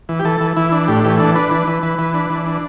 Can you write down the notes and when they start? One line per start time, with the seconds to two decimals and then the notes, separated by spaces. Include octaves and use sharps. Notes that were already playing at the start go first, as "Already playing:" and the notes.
0.09 E3
0.20 G4
0.25 E3 A4
0.41 E3
0.56 E3 E4
0.72 D4
0.88 A2 G4
1.04 E3 G4
1.20 D4 A4
1.35 D4 B4
1.51 E3
1.67 E3
1.83 E3
1.99 E3
2.14 D4
2.30 E3
2.46 D4